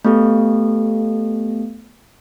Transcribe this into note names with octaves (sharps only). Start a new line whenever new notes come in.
A3 B3 G4 A4